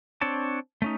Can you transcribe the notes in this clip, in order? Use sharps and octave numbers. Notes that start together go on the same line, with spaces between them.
C4 D4 C#5 A5
A3 C#4 D#4